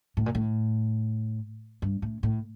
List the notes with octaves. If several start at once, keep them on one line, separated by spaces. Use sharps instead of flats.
A2
A#2
A2
G2
A2
A2